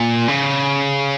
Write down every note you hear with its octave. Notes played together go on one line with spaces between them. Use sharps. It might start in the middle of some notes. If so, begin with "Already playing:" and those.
Already playing: A#2
C#3